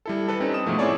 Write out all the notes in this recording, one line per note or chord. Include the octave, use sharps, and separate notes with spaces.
G3 E4 A4
E4 A4 B4
G3 C4 C#4 D#4
D#6 E7
G#2 B2 F3 A3
C4 E4 G#4 C#5 D5 A5